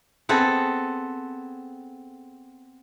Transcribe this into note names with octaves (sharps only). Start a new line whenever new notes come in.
B3 C4 G#4 A4